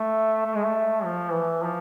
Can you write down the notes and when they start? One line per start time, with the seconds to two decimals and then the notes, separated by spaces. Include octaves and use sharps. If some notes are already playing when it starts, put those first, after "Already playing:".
Already playing: A3
0.46 A3
0.55 G#3
0.64 A3
1.04 F3
1.34 E3
1.63 F3